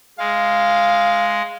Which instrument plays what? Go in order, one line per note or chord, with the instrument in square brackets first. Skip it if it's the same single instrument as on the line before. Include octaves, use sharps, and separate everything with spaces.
[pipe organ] G#3 [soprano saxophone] F5